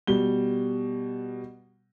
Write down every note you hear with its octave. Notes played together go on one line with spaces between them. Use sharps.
B2 G3 G7